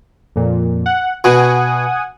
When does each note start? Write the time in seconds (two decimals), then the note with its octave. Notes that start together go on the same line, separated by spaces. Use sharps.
0.36 F2 A#2
0.86 F#5
1.24 B2 F#5 G#5 D#6